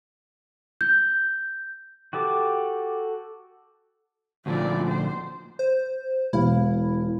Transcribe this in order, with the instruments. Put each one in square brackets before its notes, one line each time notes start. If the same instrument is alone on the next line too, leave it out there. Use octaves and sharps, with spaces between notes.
[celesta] G6
[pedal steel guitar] F#4 G4 A4 D6
[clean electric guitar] D2 A#2 F3 [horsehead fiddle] F4 D5
[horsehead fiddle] C5
[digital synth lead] C5
[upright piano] E1 F5 [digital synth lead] E4